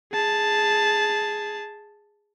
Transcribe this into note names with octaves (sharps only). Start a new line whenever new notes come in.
G#4 A5